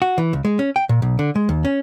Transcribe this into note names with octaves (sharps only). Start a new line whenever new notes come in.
F#4
E3
C#2
G#3
C#4
G5
A#2
B1
D3
G#3
D#2
C#4